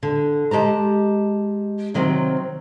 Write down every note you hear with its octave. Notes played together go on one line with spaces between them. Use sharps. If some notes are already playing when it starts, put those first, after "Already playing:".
D3
G#3 G4 A5 A#5
C3 D#3 F#3 C4